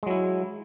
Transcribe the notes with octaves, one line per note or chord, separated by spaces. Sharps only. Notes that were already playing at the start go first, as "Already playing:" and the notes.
F#3 G#3 E4